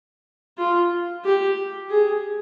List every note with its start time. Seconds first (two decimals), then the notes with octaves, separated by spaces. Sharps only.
0.58 F4
1.24 G4
1.90 G#4